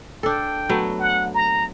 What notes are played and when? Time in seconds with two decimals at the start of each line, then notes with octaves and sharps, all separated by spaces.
0.23 D4 A4 G5
0.69 F#3 A3 B3
1.00 F#5
1.34 A#5